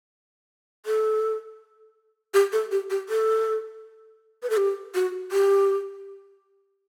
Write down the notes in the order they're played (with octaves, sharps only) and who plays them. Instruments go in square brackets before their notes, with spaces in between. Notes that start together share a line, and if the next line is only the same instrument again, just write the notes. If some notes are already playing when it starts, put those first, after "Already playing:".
[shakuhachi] A4
G4
A4
G4
G4
A4
B4
A4
G4
F#4
G4